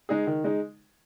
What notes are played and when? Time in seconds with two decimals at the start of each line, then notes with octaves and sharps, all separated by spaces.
0.09 G#3 D#4 G#4
0.27 D#3
0.44 G#3 D#4